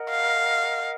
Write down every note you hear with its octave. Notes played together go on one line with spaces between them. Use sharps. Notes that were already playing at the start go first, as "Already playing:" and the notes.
Already playing: A#4 D#5 F#5
F5